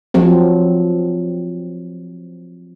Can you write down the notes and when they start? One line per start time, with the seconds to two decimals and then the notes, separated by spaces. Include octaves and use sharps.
0.14 F3 F#3 C4